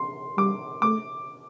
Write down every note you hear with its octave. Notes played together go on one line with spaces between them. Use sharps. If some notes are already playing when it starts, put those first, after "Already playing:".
Already playing: C6
G3 D6
A3 D6